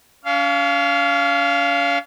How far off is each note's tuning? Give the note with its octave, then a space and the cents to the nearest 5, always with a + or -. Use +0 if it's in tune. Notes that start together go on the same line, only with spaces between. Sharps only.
C#4 +40 F5 -10